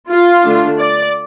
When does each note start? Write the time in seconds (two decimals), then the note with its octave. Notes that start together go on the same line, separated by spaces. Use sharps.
0.09 F4
0.44 D3 A3 D4
0.79 D5